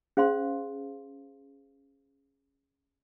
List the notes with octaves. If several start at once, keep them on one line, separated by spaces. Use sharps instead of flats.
C#4 G#4 C5 F5 C6